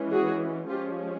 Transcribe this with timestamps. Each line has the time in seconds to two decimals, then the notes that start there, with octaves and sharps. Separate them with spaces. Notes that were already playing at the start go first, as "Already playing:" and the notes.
Already playing: E3 G#3 C#4
0.12 F#4 G#4
0.70 F3 G#3 C#4 F4 G4